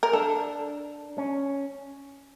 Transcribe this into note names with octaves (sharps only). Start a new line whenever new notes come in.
A#4
D4 A4
C#4